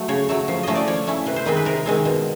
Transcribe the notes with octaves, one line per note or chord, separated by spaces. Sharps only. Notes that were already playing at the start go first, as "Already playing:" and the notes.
Already playing: F#3 A3
C#3 C#5
F#3 A3
F3
A3 C#4 E4 D#5
D5
F3 C#5
A3 C#4 E4
C3 B4
C5
D#3 G#3 C4 B4
B4
C3 A#4
D#3 G#3 C4
B2